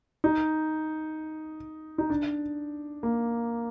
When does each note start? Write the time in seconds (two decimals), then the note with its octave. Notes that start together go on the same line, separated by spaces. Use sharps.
0.24 D#4
1.98 D#4
2.10 D4
3.03 A#3